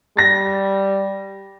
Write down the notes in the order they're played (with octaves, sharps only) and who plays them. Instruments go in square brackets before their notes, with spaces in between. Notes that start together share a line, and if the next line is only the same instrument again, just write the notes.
[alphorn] G3 [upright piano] A6 A#6